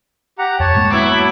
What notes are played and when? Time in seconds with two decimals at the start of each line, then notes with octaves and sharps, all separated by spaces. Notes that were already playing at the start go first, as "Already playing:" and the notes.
0.39 G4 F#5 A#5
0.60 F2 C#5 A5
0.75 G#2 G#3 A#3
0.90 F#3 B3 E4 D6